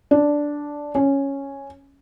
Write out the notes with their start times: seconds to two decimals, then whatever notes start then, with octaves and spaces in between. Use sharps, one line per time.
0.11 D4
0.95 C#4